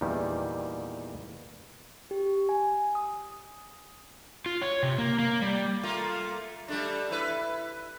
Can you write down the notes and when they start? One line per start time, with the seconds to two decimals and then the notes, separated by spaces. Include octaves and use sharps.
0.01 E2 A#2 D#3 G3
2.11 G4
2.49 G#5
2.95 D#6
4.46 F4
4.62 C#5
4.83 C3
4.98 A#3
5.19 A#3
5.42 G3
5.83 A3 A#3 F4
6.68 G3 A3 D4
7.11 E4 B4